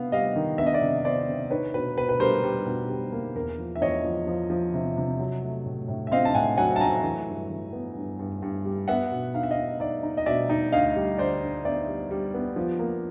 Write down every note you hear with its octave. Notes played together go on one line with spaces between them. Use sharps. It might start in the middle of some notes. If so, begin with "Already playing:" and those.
Already playing: C3 B3 F5
G3 D#5 F5
D#3
B3 E5
D#5
D5 E5
C3
B3 C5 D5
C3
D#4 B4 C#5
B2 B4
B2 B4
B4
G3 A#4 C5
G3
B2
G3
A#3
E2 A#4
F3
E5
E2 C#5 D#5
F3
F3
F3
C3
C3
F#3
A3
A2
A2
E5
C4 D#5 F5
A5
A2 F#5 G#5
F#3 F#5 G#5
A5
A3 G#5 A#5
E3
G2
E3
B3
G2
G2
G2
G3
B3 E5 F#5
B2
D#4 F5
E5
D#5 F5
D#4
D#4 D5 E5
D#4
D#5
B2 D5 E5
D#4
D2 D#5 F5
G3
D3 C5 D5
D3
B3 D5 E5
G3
G3
B3
F3
A#3